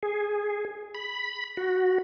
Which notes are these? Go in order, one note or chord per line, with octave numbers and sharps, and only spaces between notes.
G#4
B5
F#4